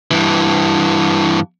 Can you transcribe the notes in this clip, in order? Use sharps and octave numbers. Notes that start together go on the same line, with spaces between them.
G2 E3